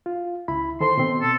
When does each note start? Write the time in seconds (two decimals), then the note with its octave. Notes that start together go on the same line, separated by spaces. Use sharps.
0.06 F4
0.48 C#2 E4 B5
0.80 D#3 A4 C5 C6
0.97 B2 C4
1.22 A4